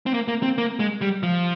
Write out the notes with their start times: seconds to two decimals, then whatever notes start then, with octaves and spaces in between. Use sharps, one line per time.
0.06 C4
0.14 A#3
0.28 A#3
0.43 C4
0.58 A#3
0.79 G#3
1.01 G3
1.23 F3